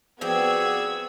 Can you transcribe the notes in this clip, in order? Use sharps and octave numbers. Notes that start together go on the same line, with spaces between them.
F3 B3 C4 F#4 G#4 D5 E6 G#6